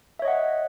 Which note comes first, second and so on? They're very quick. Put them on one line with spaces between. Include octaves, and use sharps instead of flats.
E5 C#5 D#5 F#5